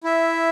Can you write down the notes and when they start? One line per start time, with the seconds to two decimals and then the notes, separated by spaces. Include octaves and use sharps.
0.04 E4 E5